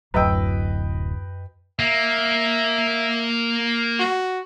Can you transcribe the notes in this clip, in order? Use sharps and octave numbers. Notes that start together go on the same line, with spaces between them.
D1 F#2 F#3 E4 B4 D#5 G5 E6
A#3 E5
F#4